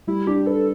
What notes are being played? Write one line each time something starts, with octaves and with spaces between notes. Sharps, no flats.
G3 E4
D4 G4
A4 B4